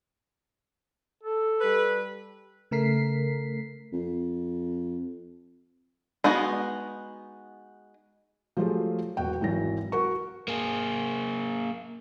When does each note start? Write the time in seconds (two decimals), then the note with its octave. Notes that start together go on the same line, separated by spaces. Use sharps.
1.23 A4
1.61 G3 B4
2.71 C#3 A3 A#4 B6 C7
3.93 F2
6.24 G#3 B3 D#4 F#4
8.57 F3 F#3 A3 F4 G4 G#4
9.17 E1 F#4 G5
9.41 G#1 E3 F#3 A#6
9.92 F#4 A#4 C#6
10.48 A#3 G#4